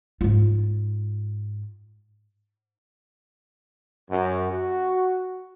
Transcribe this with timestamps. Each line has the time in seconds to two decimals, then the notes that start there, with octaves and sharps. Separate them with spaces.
0.21 G#2 F4
4.10 F#2
4.51 F#4